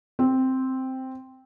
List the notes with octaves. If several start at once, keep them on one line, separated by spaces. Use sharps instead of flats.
C4